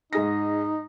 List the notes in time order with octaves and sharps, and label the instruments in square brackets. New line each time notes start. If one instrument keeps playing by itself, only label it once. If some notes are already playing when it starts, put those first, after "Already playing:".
[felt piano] G#2 G#4 A#6 [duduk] D#4